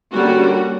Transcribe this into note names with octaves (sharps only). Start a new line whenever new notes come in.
D3 G3 A#3 C#4 F#4